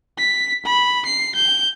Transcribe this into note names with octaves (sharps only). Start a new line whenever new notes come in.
B6
B5
C7
G6